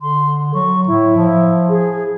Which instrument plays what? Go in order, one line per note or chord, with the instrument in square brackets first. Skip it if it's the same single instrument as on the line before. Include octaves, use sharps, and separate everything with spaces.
[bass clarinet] D3 [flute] C6
[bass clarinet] F#3 [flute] C#6
[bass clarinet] A2 [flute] E4
[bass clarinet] F3
[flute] G#4